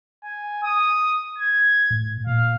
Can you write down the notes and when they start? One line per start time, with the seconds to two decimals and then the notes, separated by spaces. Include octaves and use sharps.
0.24 G#5
0.63 D#6
1.39 G#6
1.91 A2
2.27 A#2 F5